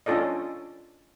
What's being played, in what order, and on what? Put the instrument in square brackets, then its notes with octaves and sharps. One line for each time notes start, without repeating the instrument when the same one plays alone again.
[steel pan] C#4 D4 F4 A4 D5 D#5